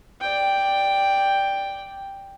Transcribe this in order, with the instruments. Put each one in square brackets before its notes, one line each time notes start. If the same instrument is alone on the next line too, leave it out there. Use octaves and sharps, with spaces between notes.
[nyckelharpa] D5 G5